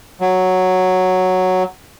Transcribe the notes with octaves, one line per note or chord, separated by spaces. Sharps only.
F#3